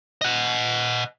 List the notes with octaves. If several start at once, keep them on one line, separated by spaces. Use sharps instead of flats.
D#5 F#5